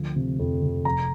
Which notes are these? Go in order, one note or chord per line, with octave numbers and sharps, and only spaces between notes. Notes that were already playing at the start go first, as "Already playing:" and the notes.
Already playing: D2 F3
C3
F2
C3
F1 A#5